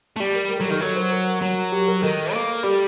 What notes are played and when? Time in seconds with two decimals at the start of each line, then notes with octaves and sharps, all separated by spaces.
0.16 A3
0.20 G3 G4
0.36 A#4
0.51 A#4
0.58 A4
0.61 F#3 G4
0.71 D#3 A4
0.81 F#3 A#4
0.96 C5
1.12 A#4
1.42 F#3
1.72 G4
1.88 A#4
2.03 D#3 A4
2.34 A#3
2.64 G3 G4